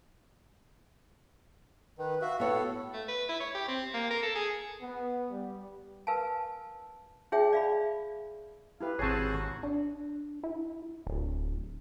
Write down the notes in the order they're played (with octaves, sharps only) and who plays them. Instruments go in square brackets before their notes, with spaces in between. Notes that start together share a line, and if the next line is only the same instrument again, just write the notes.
[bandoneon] D#3 [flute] B4
[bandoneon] F#4 E5 [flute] F5
[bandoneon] A2 A4 [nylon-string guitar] B3 F#4 C#5
[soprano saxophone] A3
B4
E4
C#5
G4
C4
A#3
A#4
A4
G#4
[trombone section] B3
G3
[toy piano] A#4 B4 F5 G#5 A5
D#4 G#4 C#5 E5 G5
D5 E5 F5 B5
[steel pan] E4 G4 B4 [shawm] F5
[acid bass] G#1 [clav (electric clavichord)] C4 G#4 [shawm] F#4 [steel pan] C#5 G#5 A5
[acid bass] D4
E4
D1